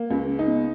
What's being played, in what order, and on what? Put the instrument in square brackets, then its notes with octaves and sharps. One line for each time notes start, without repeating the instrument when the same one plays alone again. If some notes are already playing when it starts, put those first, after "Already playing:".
Already playing: [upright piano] A#3
[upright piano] C#2 [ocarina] C#4
[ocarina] C#4
[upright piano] D#4
[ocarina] B3